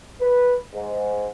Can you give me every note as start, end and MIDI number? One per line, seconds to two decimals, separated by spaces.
0.20 0.57 71
0.74 1.27 44